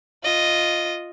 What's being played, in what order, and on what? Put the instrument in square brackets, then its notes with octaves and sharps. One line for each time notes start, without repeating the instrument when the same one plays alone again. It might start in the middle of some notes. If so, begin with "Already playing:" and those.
[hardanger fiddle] F4 D#5